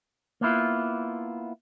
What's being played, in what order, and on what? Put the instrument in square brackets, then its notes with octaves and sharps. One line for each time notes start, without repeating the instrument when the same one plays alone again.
[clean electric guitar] A#3 B3 E4 F4